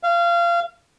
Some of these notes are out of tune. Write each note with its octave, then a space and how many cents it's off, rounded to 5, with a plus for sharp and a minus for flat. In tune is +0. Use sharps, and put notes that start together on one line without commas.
F5 -25